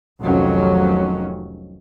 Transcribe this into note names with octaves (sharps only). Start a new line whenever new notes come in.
F1 C2 F2 D#3 F#3 C#4